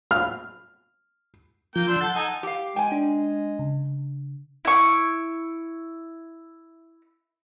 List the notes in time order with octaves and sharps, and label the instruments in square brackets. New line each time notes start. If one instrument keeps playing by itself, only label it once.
[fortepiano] F6
[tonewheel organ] F3 G6 [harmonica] A#3 G5
[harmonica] D4 C6 E6
[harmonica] A4 [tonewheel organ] F#5 A5 G6
[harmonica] D#4 A4 G#5
[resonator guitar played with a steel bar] G4 F5
[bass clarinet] G#3 [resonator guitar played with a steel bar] G5 G#5
[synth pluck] D4
C#3
[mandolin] E4 C#6